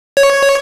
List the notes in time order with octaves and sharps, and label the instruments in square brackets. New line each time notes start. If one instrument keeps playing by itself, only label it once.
[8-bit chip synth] C#5